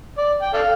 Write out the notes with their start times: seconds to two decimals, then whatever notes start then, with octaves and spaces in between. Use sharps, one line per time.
0.18 D5
0.42 G5
0.54 A4 D5 F5